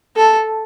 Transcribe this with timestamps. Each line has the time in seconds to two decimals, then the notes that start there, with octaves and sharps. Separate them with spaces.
0.16 A4